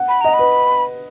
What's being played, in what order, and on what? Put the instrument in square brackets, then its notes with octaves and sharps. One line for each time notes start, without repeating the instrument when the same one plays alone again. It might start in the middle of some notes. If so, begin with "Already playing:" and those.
Already playing: [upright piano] F#5
[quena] B5
[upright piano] D#5 [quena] A#5
[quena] B5
[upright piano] B4